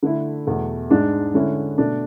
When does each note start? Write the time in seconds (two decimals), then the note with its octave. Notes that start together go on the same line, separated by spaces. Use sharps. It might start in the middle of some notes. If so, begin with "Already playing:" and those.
0.03 D3 A3 E4
0.47 E2 B2 A3
0.90 G#2 G#3 D4
1.34 D3 G#3 C#4 E4
1.78 B2 A3 D4